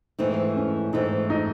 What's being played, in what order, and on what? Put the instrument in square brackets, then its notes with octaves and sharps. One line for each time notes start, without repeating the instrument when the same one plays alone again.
[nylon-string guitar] G#2 E3 A3 C4 [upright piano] D#4
[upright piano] C#4
[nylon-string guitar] G#2 E3 A3 C4 [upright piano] D#4
[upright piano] D#4